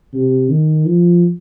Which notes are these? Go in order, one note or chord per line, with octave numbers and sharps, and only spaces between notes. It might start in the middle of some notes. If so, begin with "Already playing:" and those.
C3
D#3
F3